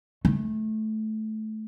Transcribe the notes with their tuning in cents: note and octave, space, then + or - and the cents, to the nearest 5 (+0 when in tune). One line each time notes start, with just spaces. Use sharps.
A3 -15